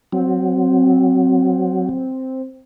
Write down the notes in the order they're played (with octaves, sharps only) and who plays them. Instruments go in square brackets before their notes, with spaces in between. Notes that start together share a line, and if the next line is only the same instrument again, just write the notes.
[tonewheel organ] F#3 [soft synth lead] C4